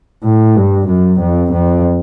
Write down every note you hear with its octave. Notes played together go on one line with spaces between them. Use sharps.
A2
G2
F#2
F2
F2